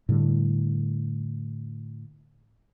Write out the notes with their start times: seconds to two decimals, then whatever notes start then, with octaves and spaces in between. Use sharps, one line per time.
0.09 A2 D3 G3